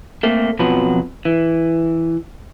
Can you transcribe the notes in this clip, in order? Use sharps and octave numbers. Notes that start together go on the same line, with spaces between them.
A3 A#3 C4
F2 B2 F3 F#3 B4
E3